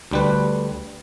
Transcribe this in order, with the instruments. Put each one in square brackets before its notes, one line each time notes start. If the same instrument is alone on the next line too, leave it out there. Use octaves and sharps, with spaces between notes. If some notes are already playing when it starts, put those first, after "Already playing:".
[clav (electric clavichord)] D2 G3 B4